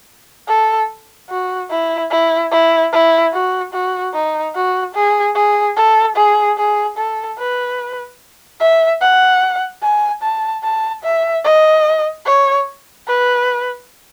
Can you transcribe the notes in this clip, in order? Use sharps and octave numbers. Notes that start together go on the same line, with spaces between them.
A4
F#4
E4
E4
E4
E4
F#4
F#4
D#4
F#4
G#4
G#4
A4
G#4
G#4
A4
B4
E5
F#5
G#5
A5
A5
E5
D#5
C#5
B4